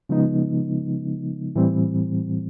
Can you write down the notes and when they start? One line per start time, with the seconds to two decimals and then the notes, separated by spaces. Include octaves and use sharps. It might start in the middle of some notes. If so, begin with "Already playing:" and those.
0.09 C#3 F3 G#3 B3 D#4
1.55 A2 E3 G3 C4